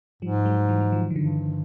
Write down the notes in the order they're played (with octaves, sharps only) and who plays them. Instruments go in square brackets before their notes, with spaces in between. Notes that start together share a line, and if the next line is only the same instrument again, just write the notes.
[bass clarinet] G#2 [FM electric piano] F3 G3
[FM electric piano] F#3 G#3
E3 F#3
F#3
D#3 F3
D#3
[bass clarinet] G2 [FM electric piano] D3 E3